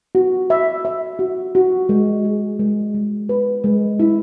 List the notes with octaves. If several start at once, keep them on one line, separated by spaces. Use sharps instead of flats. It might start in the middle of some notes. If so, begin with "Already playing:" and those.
F#4
E5
E5
F#4
F#4
G#3
G#4
G#3
G#3
B4
G#3
E4